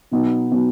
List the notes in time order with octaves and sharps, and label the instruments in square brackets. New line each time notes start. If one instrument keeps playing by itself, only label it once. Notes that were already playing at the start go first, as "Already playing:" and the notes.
[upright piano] B2 F#3 B3 D#4
B2 F#3 B3 D#4